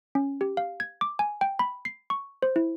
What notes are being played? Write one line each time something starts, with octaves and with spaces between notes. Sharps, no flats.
C#4
G4
F5
G#6
D6
G#5
G5
B5
C7
C#6
C5
E4